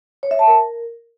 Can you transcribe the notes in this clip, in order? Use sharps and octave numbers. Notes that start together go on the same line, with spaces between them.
C#5
E5
A5
A#4